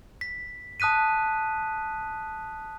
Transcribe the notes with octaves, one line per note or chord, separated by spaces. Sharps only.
B6
A5 D#6 F#6 B6 D#7